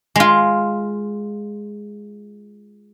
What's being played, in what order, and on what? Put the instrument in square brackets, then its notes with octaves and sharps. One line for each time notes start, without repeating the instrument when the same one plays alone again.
[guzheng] G#3 F4